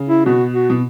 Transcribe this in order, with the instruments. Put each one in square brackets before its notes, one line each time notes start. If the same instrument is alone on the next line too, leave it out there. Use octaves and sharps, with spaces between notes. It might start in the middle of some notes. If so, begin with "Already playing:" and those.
Already playing: [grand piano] C#3
[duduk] E4
[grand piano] B2 [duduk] F#4
[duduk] F#4
[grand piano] B2